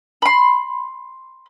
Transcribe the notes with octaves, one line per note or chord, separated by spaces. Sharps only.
B5 C6